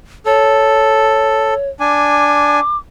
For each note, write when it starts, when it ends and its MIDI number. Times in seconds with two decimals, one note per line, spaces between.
0.26 1.54 69
0.26 1.69 73
1.80 2.60 62
1.80 2.60 80
1.80 2.77 86